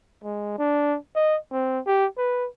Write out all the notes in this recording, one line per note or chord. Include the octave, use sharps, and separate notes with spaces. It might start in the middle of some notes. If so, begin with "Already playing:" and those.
G#3
D4
D#5
C4
G4
B4